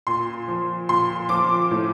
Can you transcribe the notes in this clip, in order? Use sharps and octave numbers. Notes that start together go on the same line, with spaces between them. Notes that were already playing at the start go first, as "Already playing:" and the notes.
A#2 C6
F3
A#2 C6
F3 D6
A2